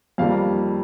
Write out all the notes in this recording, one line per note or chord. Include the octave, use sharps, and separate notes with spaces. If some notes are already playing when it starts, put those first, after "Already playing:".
F2 D#3 G3 A#3 F5